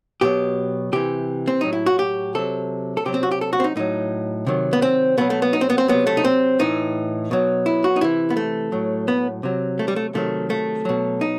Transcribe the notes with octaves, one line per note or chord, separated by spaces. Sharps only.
B2 F#3 G4
C3 E3 G4
C4
A2 F#3 D#4
E4
F#4
G4
C3 F#3 A4
A4
C3 F#3 G4
C4
F#4
G4
A4
F#4
C4
D#4
A2 F#3 D#4
C3 D#3 F#3
B3
C4
B2 F#3 B3
A3
B3
D#4
C4
B3
C4
C3 F#3 B3
A3
D#4
C4
A2 E3 D#4
B2 F#3
E4
F#4
D#4
C3 E3 E4
B3
A3
A2 F#3
B3
C3 F#3
A3
G3
A3
C3 D#3 F#3 A3
A3
B2 F#3
D#4